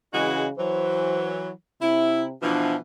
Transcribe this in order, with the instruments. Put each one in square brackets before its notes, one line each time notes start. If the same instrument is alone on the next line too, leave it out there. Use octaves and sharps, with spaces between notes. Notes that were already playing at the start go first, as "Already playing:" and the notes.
[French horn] C#3 [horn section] E3 G#3 F#4
[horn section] E3 F#3 [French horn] C5
[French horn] C3 [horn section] E4
[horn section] B2 E3 F3 [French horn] D4